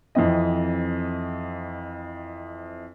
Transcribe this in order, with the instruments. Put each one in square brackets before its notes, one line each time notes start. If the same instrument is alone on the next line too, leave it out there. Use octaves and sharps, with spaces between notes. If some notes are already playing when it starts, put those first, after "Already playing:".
[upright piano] F2 E3 C4 D#5